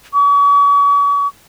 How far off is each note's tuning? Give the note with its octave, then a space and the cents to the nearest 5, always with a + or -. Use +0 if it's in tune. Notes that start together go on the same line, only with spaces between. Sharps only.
C#6 +40